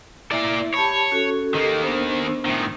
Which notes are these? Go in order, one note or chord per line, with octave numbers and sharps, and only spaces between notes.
A#3 E4 D5 E5
G4 C#5 A5 B5
C#4 F#4 A4
D#3 A#3 G4 A4 D#5
B3 D4 C5
A2 D#3